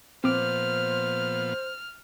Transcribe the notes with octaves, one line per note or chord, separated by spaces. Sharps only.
A#2 F3 B3 C4 C5 D6 F6